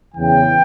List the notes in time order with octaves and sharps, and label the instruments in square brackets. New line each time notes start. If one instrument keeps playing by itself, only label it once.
[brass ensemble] E2 C#3 E3 G5